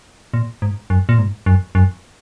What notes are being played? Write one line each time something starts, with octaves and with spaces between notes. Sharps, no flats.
A#2
G#2
F#2
A#2
G#2
F#2
F#2